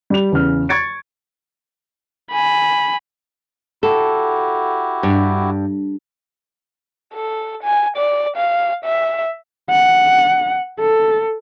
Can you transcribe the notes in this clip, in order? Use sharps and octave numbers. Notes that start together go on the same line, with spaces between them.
G3 G4 F7
E2 C#3 F6
C#6 G#6 A6 C#7 D7
G#5 B5
E4 F#4 G4 A4
G2
A4
G#5
D5
F5
E5
F#5
A4